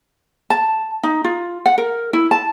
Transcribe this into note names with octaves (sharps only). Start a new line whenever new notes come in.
A5
D#4
F4
F#5
A#4
E4
A5